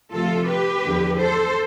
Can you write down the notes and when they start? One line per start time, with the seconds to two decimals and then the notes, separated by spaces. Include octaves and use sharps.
0.12 D2 C3 F3 F4 A4
0.47 G4 B4
0.83 E2 D3 F3
1.18 A4 C5